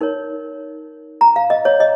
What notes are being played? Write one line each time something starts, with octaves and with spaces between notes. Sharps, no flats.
D#4 A#4 C#5
A#5
F5
D#5
C#5
D#5